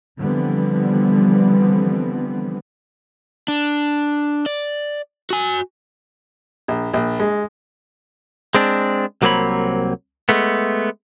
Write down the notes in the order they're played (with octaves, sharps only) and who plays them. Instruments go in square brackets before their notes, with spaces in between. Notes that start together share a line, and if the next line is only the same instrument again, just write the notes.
[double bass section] D3 E3 F3 G3 B3 C4
[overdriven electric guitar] D4
D5
F#4 G#5
[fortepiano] A#1
A#1
G#3
[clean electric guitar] G#3 C4 D4
C2 F#3 A#3 C4 C#5 B5
G#3 A3 B3